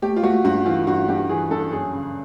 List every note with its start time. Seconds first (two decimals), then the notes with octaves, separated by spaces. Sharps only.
0.02 A3 G4
0.16 F4
0.23 A3 F#4
0.44 G2 F#4
0.65 E3 F4
0.87 G2 F#4
1.08 G2 G4
1.29 E3 G#4
1.51 G2 A4
1.72 F#2 G#4
1.93 C#3